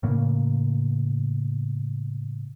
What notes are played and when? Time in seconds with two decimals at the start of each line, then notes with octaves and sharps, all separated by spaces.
0.03 A2 C#3 A#3